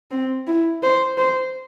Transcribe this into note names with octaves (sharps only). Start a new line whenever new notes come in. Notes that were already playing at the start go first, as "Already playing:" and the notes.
C4
E4
C5
C5